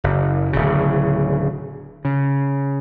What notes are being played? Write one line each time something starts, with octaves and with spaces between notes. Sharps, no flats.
F#1
D1 C#3
C#3